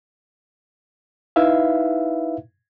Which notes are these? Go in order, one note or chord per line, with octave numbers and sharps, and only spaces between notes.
D#4 E4 B4 E5 F5